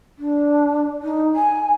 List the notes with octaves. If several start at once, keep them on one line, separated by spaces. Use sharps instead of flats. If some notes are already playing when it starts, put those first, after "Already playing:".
D4
D#4
G#5